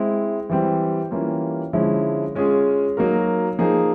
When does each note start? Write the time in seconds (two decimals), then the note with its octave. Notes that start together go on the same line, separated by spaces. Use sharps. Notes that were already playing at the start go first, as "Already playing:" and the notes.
Already playing: G#3 C4 E4
0.49 E3 G3 C4
1.11 E3 G3 A#3 C#4 F4
1.73 D3 F3 G#3 C#4 E4
2.35 G#3 C#4 F4 G#4
2.97 F#3 A#3 D#4 F#4 A#4
3.59 F3 A#3 D#4 G#4